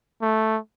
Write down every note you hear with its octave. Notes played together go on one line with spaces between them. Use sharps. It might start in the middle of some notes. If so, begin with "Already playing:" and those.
A3